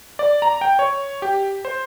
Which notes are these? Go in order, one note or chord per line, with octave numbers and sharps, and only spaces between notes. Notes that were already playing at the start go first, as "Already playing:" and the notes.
D5
A#5
G5
C#5
G4
C5